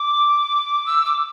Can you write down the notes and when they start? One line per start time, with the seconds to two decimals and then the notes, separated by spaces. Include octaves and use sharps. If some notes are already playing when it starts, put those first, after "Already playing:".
Already playing: D6
0.86 E6
1.05 D6